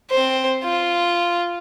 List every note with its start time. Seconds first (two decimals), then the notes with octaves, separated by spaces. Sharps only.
0.11 C4 C5
0.64 F4